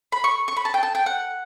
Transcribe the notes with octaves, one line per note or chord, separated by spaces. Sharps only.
B5
C#6
C#6
B5
A5
G5
A5
G5
F#5